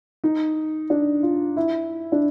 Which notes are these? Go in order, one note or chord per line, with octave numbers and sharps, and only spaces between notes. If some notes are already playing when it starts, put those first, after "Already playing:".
D#4
D4
F4
E4
D4